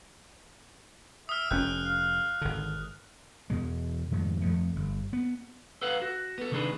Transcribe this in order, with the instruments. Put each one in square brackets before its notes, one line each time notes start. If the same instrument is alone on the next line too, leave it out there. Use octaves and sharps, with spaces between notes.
[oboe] E5 [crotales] D#6 F6
[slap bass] F1 C#4 [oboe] G5 [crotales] F#6
[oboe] F5
[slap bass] G#1 D3
E2 B2 G#3
F2 G#2 D#3
F2 F3 A3
G1
B3
[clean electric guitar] A4 B4 F5 F#5
F#4
B3 A4
C3 D#3 G#3 D4 G#4 B4